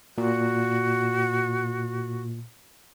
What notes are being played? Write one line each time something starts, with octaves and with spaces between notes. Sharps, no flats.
A#2 F#4